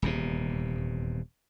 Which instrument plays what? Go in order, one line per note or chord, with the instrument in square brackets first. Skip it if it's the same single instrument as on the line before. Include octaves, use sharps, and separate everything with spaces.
[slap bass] D#1 E2 C3